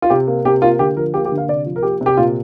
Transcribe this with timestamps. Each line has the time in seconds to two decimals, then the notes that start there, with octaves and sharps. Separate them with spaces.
0.02 F4
0.10 C3 G4
0.27 A#3
0.45 C3 G4
0.62 A#3 F4
0.79 D3 G4
0.96 F3 A#4
1.14 A#3 G4
1.25 G4
1.32 D3
1.38 F5
1.48 C3 D5
1.66 F3
1.76 A#4
1.83 A#3 G4
2.01 C3
2.06 G4
2.17 A#2 F4